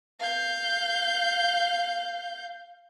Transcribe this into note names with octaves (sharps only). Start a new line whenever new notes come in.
F5 G6